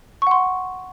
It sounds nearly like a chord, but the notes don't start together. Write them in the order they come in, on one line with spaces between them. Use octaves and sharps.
C#6 F#5 C6